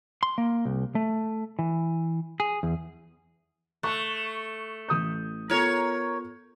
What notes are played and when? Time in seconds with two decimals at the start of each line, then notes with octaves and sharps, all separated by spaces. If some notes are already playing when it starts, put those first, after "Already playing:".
0.23 C6
0.38 A#3
0.65 C2
0.95 A3
1.59 E3
2.40 G#4
2.63 E2
3.83 A3 C#6 F#6
4.89 A1 D#6 G6
5.50 B3 F4 A4 A#4 C#5